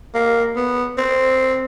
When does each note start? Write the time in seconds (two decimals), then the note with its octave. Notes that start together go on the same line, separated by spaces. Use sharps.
0.15 A#3
0.57 B3
0.98 C4